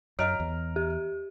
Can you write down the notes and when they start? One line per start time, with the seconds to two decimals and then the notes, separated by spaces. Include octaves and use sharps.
0.19 F#2 C#5 D#5 F5 A#5 F6 D7
0.40 E2
0.76 G4